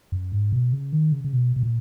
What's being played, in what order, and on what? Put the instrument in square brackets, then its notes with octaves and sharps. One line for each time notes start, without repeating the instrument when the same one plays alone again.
[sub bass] F#2
G#2
B2
C#3
D#3
C#3
C#3
B2
B2
A#2